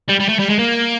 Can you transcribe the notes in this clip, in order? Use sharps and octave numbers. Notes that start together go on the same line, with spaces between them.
G3
G3
A3
G3
G#3
A#3